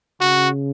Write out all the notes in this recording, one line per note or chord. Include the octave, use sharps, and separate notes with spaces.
C#3 F#4